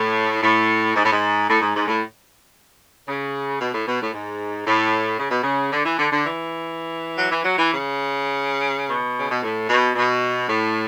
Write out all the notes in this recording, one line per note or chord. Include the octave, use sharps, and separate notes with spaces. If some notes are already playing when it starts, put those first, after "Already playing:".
Already playing: A2
A2
G#2
A2
G#2
A2
G#2
G#2
A2
C#3
B2
A2
B2
A2
G#2
A2
C#3
B2
C#3
D3
E3
D3
D3
E3
F#3
E3
F#3
E3
C#3
B2
C#3
B2
A2
B2
B2
A2